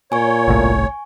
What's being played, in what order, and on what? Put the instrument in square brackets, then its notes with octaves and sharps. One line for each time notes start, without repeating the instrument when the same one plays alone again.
[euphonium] A#2 [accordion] C#5 [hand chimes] G#5 C#6
[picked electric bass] G1 C2 A2